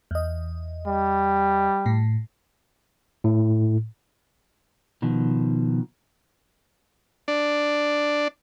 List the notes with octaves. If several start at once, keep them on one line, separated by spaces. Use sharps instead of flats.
E2 D#5
G3
A2
A2
B2 D#3 F3
D4